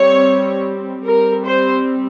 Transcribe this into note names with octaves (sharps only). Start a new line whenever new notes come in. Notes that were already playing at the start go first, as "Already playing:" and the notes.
Already playing: G3 C4 C#5
G3 C4 A#4
C5